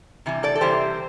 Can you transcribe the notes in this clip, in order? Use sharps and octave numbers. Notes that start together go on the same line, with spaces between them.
C3 E3 G3
A4 D5
A4
C3 E3 G3 G4 C5